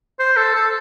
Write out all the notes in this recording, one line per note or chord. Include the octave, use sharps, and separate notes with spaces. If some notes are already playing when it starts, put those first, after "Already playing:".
C5
A4
A4